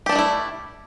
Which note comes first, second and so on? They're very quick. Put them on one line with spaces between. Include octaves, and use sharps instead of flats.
G4 D4 G3 A3 E4